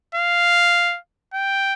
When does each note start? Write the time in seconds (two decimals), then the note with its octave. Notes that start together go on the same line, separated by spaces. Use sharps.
0.15 F5
1.34 G5